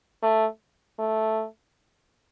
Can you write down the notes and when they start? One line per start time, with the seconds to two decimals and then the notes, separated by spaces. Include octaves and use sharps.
0.23 A3
0.99 A3